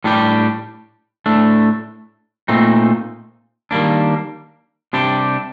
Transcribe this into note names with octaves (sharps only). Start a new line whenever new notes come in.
A2 G3 D4 G4
A2 A3 D4
A#2 A3 C4 D#4
D#3 G3 A#3 D4
C3 G3 D4 G4